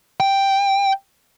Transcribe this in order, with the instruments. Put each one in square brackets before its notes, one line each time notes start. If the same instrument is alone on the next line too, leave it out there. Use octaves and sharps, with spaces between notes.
[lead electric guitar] G5